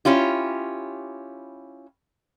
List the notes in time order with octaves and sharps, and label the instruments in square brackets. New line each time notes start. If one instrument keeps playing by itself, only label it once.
[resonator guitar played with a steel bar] C#4 E4 F4 G4